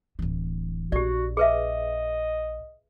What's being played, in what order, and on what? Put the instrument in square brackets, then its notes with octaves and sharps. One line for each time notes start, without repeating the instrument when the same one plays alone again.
[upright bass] D1 E3
[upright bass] A#1 [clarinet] F#4 [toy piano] G4 D5
[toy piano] G#4 B4 E5 [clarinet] D#5